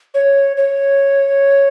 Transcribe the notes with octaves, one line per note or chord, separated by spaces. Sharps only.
C#5
C#5